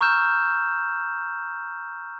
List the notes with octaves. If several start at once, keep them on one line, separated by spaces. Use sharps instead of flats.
A#5 C#6 E6 F6 G6 E7